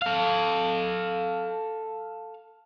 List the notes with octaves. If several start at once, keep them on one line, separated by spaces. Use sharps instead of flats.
A4 F5